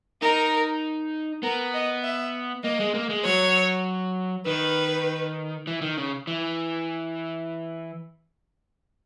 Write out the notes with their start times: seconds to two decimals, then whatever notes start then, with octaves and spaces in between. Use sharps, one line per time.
0.22 D#4 A#4
1.43 B3 A#4
1.74 D#5
2.04 E5
2.64 A#3 D#5
2.80 G#3
2.94 A#3
3.09 G#3
3.25 F#3 C#5
4.46 D#3 B4
5.67 E3
5.82 D#3
5.97 C#3
6.27 E3